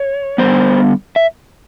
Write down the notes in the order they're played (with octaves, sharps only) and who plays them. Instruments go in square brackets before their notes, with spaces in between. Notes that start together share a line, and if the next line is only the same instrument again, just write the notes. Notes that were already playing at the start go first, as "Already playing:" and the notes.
Already playing: [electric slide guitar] C#5
D3 G3 B3 C5
E5